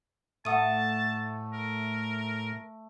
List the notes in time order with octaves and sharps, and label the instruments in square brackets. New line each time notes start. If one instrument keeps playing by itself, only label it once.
[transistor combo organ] A2 [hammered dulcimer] A3 [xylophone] F#5 D#6 D#7 [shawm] A5
[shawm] A#4